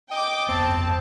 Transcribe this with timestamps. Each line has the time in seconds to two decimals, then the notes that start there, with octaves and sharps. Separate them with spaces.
0.11 D#5 G5 D6
0.49 G1 F2 B3 C4 A5